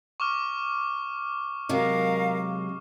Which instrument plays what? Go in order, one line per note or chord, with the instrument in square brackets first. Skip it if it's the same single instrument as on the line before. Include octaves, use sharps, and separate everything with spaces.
[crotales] C#6 D6 F6
[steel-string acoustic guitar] C3 F#3 G#3 [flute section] A#4 F5